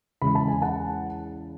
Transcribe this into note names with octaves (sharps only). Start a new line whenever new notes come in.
E2 C#3 G#3 B5
A5
G#5
F#5 A5